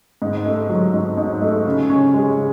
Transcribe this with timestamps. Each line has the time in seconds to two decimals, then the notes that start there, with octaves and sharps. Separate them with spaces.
0.22 G#2
0.46 A3
0.70 F#3
0.93 G#2
1.17 G#2
1.42 A3
1.65 C#3
1.90 C#4
2.14 G#3
2.38 C#3